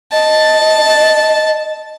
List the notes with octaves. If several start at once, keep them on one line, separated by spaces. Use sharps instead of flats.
D#5 A5